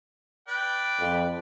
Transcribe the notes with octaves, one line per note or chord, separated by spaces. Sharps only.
B4 D5 G5
F2